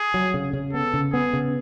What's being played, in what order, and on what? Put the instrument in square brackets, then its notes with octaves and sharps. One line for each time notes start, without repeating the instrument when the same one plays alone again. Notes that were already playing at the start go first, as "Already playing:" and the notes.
Already playing: [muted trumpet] G#4
[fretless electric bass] F#3
C#3
C#3
[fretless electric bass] B3 [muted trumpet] A4
[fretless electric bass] C#3
[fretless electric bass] B3 [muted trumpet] G#4
[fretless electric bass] C#3